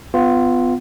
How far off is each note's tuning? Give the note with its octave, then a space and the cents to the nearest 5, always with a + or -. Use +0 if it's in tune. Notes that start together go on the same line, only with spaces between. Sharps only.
B3 +25 F4 +0